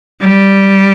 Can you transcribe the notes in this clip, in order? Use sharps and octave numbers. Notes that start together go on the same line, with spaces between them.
G3